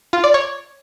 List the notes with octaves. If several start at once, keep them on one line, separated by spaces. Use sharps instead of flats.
F4
D5
C#5